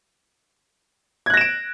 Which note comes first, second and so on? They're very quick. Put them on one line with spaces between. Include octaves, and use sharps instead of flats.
G#6 F#6 A#6 E7 D7